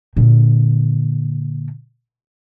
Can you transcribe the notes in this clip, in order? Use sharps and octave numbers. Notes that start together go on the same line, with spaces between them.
A#2 D3